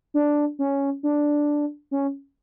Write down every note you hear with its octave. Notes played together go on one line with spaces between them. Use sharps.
D4
C#4
D4
C#4